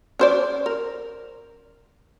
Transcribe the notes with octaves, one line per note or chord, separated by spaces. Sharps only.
C#4 C5 D5
A#4